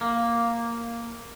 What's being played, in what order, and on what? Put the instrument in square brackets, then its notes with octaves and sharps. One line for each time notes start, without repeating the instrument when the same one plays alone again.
[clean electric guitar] A#3